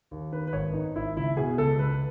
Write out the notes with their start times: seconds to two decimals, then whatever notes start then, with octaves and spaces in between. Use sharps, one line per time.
0.11 D#2
0.32 D#3 B4
0.47 B4
0.53 G#1 C#5
0.74 D#3 D#4
0.95 G#1 E4
1.16 C#2 E4
1.37 B2 G#4
1.58 C#2 A4
1.79 C#2 B4